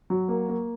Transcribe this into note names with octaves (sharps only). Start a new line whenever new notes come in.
F#3
A#3
A#3